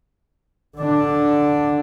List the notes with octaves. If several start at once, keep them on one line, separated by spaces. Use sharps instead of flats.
D3 D4